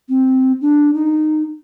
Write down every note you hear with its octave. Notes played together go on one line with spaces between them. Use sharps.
C4
D4
D#4